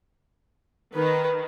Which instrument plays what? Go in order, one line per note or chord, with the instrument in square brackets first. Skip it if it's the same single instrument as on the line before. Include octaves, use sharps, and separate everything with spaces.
[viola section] D#3 [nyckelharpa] B4